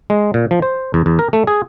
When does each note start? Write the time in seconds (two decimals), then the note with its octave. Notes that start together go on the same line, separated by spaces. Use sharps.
0.10 G#3
0.34 A#2
0.51 F3
0.62 C5
0.94 E2
1.06 E2
1.19 A#4
1.33 A3
1.47 G#4